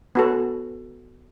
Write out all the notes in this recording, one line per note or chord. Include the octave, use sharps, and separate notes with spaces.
B3 F#4 A4